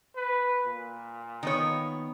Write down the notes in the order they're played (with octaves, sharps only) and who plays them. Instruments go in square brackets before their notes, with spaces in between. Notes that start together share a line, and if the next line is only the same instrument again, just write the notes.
[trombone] B4
A#2
[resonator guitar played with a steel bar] D#3 B3 C#5